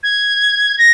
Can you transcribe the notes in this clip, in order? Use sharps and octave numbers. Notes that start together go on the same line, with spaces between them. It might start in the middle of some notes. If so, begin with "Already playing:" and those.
G#6
A#6